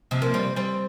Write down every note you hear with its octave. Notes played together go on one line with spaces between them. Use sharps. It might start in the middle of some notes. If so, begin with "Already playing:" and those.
C3 F3
F3 A#3
G3 C4
G3 C4